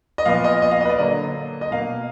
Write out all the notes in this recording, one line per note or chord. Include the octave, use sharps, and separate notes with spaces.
D#5
A#2 F3 B3 F5
D#5
D#5
F5
D#5
B4
D5
D3 F#3 A#3 D#5
D#5
B2 A#3 F5